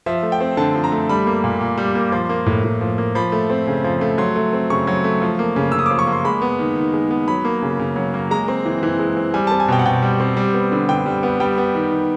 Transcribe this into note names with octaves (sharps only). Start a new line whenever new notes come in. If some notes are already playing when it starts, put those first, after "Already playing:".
F3 E5
A3
G5
C4
D3 A5
F3
A#5
A3
G3 B5
A#3
A#2
A#2
G3
A#3
F3 C6
A#3
A2
A2
F3
A#3
F3 B5
A3
C4
C#3
F3
A3
F#3 C6
A3
C4
C#3 C#6
F#3
A3
F3
A#3
C#3
C#3 E6
D#6
F3 D6
C#6
A#3
C6
G#3 B5
B3
D#3
D#3
G#3
B3
F#3 B5
A#3
C#3
C#3
F#3
A#3
G#3 A#5
C4
E3
E3
G#3
C4
G3 G#5
C4 A5
G#5
B2 G5
F#5
B2 G5
G3
C4
G3
B3
D3
D3 G5
G3
B3
G3 G5
B3
D#3
D#3